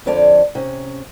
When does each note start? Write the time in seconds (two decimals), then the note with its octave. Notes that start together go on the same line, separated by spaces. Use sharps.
0.06 F2 D3 F3 C#5 D5 A5
0.55 C3 C#4